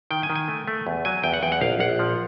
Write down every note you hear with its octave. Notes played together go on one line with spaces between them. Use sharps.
D#3 G5
G#5
D#3
G#5
A3
A3
E2
F#3 G#5
E2 G5
F#5
E2 G5
F#5
A#1 F5
A#1 F#5
F3